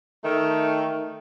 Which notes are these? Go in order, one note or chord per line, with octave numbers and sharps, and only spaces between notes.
D#3 A3